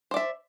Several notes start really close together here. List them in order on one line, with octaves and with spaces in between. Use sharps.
C5 D5 E5